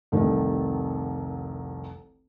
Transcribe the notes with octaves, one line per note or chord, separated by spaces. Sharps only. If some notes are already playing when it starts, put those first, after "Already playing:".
F1 C2 D#3